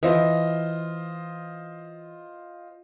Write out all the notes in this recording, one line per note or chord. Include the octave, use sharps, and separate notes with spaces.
E3 F4 C5 D#5